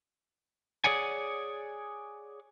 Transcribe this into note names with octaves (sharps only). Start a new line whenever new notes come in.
G#4 C#5 D5 F#5 G#5